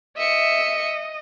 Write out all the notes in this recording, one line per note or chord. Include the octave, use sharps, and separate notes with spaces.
D#5 E5 C#7